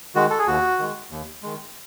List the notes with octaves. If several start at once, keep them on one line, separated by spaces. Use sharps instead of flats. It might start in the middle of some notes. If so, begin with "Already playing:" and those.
D#3 G#3 F#4
A4
G#4
D#2 F#4
D#3 G#3
D#2
D#3 G#3